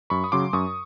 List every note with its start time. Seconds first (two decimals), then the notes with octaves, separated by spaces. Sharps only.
0.10 F#2 B5 C#6
0.24 D#6
0.32 C#3 F#3 C6 D6
0.53 F#2 C#6 D#6